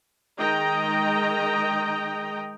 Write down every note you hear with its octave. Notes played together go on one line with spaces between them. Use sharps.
D#3 G#3 D#5 G5 A#5